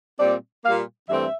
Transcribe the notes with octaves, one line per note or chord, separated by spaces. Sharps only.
A#2 G3 C4 D5
A#2 G3 A#3 F5
G2 E3 A3 C4 E5